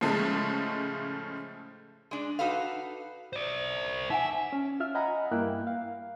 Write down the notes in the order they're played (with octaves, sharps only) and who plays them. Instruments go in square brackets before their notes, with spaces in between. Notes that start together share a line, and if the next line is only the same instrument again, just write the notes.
[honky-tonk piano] A2 C#3 F3 G#3 A3
[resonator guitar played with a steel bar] G#3 D4
D#4 F#4 A4 B4 F5
[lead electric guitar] C5 D5
[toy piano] D#4 F#5 G#5 [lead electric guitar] E5
[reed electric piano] C#4
F4 E5 F6
D#5 F#5 G#5 A#5 B5
G2 A#3 E4 G5 F#6
F5